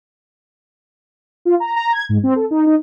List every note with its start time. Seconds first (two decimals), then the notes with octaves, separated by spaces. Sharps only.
1.45 F4
1.60 A#5
1.76 A#5
1.93 G#6
2.09 G#2
2.23 C4
2.36 A4
2.51 D#4
2.67 D#4